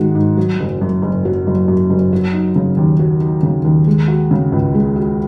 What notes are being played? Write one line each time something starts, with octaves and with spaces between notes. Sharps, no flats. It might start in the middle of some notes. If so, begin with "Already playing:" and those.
Already playing: G#2 D#3 G#3 F#4
G#2
F#3
F#1
F#2
F#1
F#3
F#1
F#2
F#1
F#3
D#4
C#3
D#2
F#3
D#4
C#3
D#2
G#3
F#4
C#3
C#2
G#3
F#4